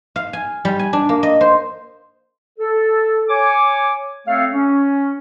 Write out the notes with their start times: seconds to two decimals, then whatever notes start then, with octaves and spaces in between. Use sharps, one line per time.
0.16 F5
0.33 G#5
0.65 G3
0.79 G#5
0.93 D4
1.09 A#3
1.23 D#5
1.41 C5
2.59 A4
3.29 C#5 G#5 D6
4.27 A3 C4 A4 C#5 F5
4.52 C#4